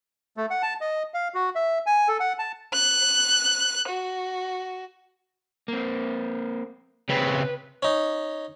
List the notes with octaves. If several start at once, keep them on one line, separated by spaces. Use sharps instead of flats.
A3
F#5
A5
D#5
F5
F#4
E5
G#5
A4
F#5
A5
F#6
F#4
A#3 C4
C#3 C4 B4
C#4 D#4